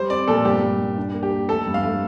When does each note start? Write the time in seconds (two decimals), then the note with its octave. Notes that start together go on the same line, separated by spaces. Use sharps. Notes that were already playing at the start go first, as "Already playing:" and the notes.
Already playing: G3 C5
0.10 C4 D5
0.28 A#2 A4
0.45 G2 G4
0.63 G2
0.80 G2
0.98 D4
1.14 A#3
1.23 G4
1.32 A#3
1.49 A3 A4
1.67 G2
1.74 F5
1.83 A3